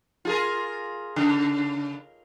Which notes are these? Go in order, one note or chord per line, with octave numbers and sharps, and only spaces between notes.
F4 G#4 A#4
C#3